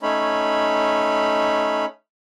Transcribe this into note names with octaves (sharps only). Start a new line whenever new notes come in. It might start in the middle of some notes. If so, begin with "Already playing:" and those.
A3 C#4 D#4 C#5 B5